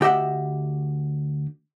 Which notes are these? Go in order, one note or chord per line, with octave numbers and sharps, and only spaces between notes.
D2 G4 D#5 E5 F#5